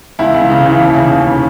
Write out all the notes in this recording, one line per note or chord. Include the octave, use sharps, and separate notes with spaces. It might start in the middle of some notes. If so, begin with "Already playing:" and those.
C#2 E4
C#2
C#3
E3
D#2
C#3
D#2
C#3